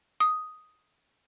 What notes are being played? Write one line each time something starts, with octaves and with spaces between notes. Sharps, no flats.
D#6